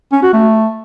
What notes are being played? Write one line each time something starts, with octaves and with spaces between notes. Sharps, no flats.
C#4
F#4
A3